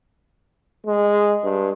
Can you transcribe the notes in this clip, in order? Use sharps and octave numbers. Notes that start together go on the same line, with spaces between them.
G#3
G2